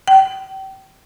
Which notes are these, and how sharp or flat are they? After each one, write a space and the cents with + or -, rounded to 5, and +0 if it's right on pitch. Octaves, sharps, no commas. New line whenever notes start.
G5 -30